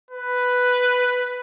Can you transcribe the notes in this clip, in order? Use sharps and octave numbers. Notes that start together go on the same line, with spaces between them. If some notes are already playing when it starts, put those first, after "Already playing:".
B4